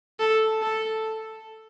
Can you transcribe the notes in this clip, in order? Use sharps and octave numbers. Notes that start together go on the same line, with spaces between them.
A4
A4